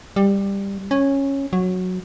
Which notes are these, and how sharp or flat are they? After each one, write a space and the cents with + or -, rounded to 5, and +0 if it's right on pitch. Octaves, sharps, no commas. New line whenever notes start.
G3 +15
C#4 -10
F#3 -10